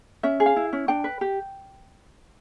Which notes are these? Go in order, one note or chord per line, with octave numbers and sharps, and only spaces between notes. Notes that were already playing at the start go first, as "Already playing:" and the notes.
C#4 E5
G#4
F5
E4
C#4
D4 G5
B4
G4